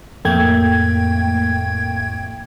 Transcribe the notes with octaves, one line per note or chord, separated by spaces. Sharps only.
F2 A2 A3 A#3 G5 G#6